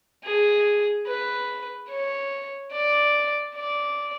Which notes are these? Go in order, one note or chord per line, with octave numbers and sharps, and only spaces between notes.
G#4
B4
C#5
D5
D5